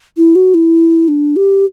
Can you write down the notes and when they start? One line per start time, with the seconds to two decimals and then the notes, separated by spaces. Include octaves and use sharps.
0.17 E4
0.35 F#4
0.54 E4
1.08 D4
1.36 G4